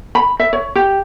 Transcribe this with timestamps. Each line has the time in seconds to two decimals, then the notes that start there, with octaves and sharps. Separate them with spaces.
0.15 B5
0.40 E5
0.53 C#5
0.75 G4